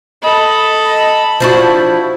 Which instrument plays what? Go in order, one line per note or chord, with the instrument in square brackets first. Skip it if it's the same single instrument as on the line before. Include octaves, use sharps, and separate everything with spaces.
[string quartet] A4 [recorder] D#5 [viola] B5
[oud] F3 D4 F#4 [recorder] E4